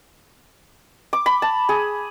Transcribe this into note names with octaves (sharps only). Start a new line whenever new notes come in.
D6
B5
A5
G#4